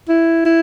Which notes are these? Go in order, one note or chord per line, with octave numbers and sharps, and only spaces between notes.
E4
E4